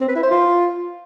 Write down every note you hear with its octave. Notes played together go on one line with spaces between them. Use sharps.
C4
B4
E4
C5
F4